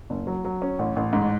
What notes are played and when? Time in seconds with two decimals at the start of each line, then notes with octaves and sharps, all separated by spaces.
0.10 F#1
0.27 F#3
0.45 F#3
0.62 C#4
0.79 A1
0.96 A1
1.13 G#2